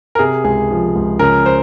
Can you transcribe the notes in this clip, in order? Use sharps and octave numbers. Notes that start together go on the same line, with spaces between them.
A#4
C3 G#4
C#2 G#4
F3
C#2
C#3 A#4
C5